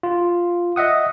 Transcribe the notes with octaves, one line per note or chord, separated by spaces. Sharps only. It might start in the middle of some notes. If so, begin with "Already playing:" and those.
F4
D#5 E5 F#5 D#6